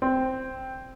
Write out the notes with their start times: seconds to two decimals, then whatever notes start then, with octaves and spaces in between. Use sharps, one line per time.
0.02 C4